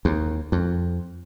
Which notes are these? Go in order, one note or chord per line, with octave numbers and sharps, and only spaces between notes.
D#2
F2